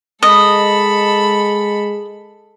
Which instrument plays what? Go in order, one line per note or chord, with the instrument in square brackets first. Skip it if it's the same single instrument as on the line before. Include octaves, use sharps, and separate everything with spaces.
[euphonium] G#3 [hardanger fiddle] A4 B5 [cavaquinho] D#5